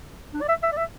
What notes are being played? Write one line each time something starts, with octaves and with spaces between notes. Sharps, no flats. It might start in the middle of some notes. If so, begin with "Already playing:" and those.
D4
D5
E5
E5
D5
E5